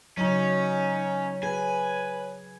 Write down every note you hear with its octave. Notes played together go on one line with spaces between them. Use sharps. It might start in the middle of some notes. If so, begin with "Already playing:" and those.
C#3 F#3 C#4 D#4 C#5
G#4 B4 G#5